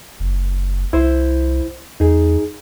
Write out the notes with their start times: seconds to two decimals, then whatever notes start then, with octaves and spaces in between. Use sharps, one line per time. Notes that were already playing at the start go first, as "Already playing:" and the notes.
0.20 F#1
0.93 C2 E4 C5
2.00 E2 D#4 G#4